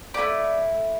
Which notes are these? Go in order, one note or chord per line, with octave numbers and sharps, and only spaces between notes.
A3 E4 G4 D5